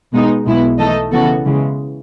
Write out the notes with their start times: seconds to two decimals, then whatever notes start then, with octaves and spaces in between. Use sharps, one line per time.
0.12 B2 G#3 B3 D#4
0.45 B1 B2 G#3 B3 E4
0.78 E3 A3 D#4 A4 D#5
1.11 C#3 E3 B3 F#4 A4
1.45 C#3 E3 G#3